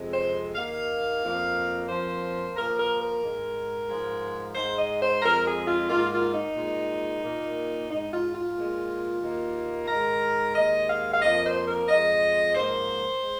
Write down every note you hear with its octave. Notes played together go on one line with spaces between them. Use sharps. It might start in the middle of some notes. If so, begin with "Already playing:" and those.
Already playing: F2 C3 G#3
C5
D#2 D#3 A#3 F5
F2 F3 A#3
F2 F3 A#3 C5
A#2 F3 A#3 A#4
A#4
A#4
G#2 G#3
G#2 F3 G#3
G#2 G#3 C5
D#5
C5
F2 F3 G#3 A#4
G#4
F4
G#2 D#3 A#3 F4
F4
D#4
A#2 G#3
A#2 A#3
G#2 G#3 D#4
F4
F4
A#2 G#3
D#2 D#3 A#3
G#2 D#3 G#3 A#4
D#2 D#3 G#3 D#5
F5
F5
F2 F3 A#3 D#5
C5
A#4
F2 F3 G#3 D#5
G#2 F3 A#3 C5
G#3